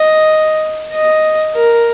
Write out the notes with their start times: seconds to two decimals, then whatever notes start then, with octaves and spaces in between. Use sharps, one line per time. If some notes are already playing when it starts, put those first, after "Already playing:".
Already playing: D#5
0.93 D#5
1.55 A#4